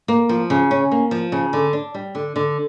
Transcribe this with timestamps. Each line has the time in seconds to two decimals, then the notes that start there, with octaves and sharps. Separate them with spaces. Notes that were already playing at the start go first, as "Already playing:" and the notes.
0.08 A#3
0.29 F3
0.50 C#3
0.71 C#4
0.92 A#3
1.11 F3
1.32 C#3
1.53 D3
1.73 D4
1.94 G3
2.15 D3
2.36 D3